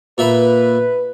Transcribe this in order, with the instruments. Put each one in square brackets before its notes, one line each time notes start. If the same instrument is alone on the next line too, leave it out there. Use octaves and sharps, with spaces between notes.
[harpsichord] A#2 E5 B5 [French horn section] B4